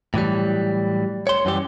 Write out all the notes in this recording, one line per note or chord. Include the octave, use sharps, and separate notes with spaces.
A2 E3 F#3 G3
C#5 C6
F#2 E3 G3 G4